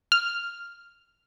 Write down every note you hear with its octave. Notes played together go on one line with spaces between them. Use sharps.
F6